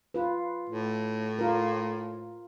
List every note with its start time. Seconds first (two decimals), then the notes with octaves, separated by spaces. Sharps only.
0.14 F4 B4
0.69 A2
1.39 F4 A#4